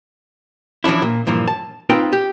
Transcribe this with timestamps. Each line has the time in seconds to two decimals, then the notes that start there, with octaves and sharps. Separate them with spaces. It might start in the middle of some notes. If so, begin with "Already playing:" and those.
0.84 E3 F3 C#4 D4 E4
1.02 A#2
1.27 G2 A#2 E3 F3
1.48 A5
1.90 C4 D#4 F4 B4 G5
2.13 G4